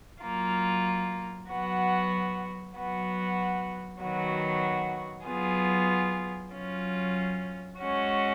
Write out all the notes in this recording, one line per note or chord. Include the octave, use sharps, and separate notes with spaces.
F#3 A#3 F4
F#3 B3 F#4
F#3 B3 F#4
D#3 F#3 B3 F#4
F#3 B3 F4 G#4
F#3 C#4 F4
G#3 C#4 F#4